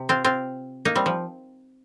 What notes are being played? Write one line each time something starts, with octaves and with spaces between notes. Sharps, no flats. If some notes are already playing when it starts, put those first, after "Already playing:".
Already playing: C3
C4 F4
C4 F4
A#3 D#4
G3 C4
F3